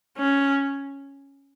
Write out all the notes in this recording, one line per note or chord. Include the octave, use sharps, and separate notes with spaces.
C#4